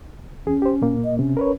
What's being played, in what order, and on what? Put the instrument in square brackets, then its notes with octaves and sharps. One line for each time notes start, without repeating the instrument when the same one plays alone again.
[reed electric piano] E2 G#4 [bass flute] C#4
[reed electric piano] G4 C5
A#2 A#3
[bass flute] D#5
[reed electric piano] C3 [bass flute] C#4
[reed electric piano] A#4 B4 C#5